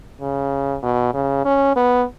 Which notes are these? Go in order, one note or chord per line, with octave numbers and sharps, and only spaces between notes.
C#3
B2
C#3
C#4
B3